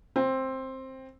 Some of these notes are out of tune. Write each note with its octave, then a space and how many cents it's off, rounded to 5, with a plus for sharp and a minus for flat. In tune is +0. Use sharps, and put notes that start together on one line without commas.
C4 +10